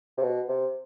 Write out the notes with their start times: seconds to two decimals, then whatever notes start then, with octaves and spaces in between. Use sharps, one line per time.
0.18 C3
0.23 B2
0.49 C3